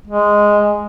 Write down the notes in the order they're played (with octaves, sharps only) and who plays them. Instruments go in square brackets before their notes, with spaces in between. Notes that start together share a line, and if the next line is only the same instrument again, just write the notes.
[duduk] G#3